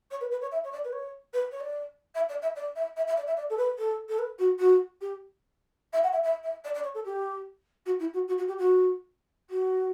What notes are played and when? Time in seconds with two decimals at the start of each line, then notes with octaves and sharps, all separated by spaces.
0.11 C#5
0.21 B4
0.31 B4
0.41 C#5
0.51 E5
0.64 C#5
0.72 D5
0.84 B4
0.92 C#5
1.33 B4
1.51 C#5
1.60 D5
2.15 E5
2.29 D5
2.42 E5
2.55 D5
2.75 E5
2.96 E5
3.07 E5
3.17 D5
3.27 E5
3.37 D5
3.50 A4
3.57 B4
3.78 A4
4.09 A4
4.18 B4
4.39 F#4
4.59 F#4
5.01 G4
5.93 E5
6.03 F#5
6.12 E5
6.23 E5
6.43 E5
6.64 D5
6.74 D5
6.83 C#5
6.94 A4
7.05 G4
7.86 F#4
7.99 E4
8.13 F#4
8.27 F#4
8.37 F#4
8.48 G4
8.58 F#4
9.50 F#4